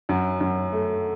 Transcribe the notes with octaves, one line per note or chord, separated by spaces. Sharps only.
F#2
F#2
A3